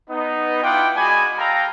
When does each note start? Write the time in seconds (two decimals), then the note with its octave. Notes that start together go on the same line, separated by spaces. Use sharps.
0.10 B3 D#4
0.63 B3 E4 F4 F#5 G5 D6
0.96 G#3 F#4 D5 D#5 G#5 B5
1.39 A4 F5 G5 A#5